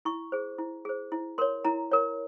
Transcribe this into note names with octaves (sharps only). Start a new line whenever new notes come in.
E4 C#6
G#4 C5
E4
G#4 C5
E4
A#4 C#5 C6
E4 A#5
A#4 C#5